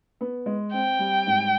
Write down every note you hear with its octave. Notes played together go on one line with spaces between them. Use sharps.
B3
G#3
C4 G5
G3
G#2